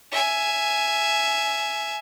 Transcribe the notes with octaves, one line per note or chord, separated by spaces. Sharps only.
E5 G#5